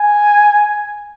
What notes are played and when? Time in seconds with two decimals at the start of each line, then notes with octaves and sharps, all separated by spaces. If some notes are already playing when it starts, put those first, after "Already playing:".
Already playing: G#5